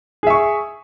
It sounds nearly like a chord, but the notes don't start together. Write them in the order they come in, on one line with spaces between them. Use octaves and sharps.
G#4 E5 C#6